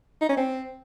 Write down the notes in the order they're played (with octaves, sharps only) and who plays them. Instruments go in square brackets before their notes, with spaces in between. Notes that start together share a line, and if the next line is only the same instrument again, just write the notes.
[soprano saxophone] D#4
C#4
C4